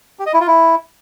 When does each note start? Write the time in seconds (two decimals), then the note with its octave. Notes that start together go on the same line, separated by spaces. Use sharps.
0.19 G4
0.26 D#5
0.33 E4
0.40 F4
0.47 E4